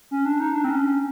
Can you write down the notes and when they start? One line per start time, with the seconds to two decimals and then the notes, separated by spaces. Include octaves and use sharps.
0.11 C#4
0.25 D4
0.40 D#4
0.54 D4
0.64 C4
0.70 C#4